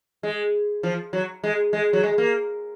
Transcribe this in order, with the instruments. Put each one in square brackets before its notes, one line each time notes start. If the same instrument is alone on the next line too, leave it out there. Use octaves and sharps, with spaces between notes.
[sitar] G#3
F3
F#3
G#3
G#3
F#3
G#3
A#3